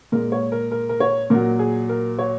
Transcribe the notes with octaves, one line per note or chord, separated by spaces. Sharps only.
A#2 G#3 A#4
C#5
A#4
A#4
A#4
C#5
A#2 F#3 A#4
G#4
A#4
C#5